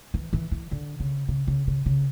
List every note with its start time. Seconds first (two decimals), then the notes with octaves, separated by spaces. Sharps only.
0.14 E3
0.33 E3
0.52 E3
0.71 D3
1.00 C#3
1.28 C#3
1.48 C#3
1.67 C#3
1.86 C#3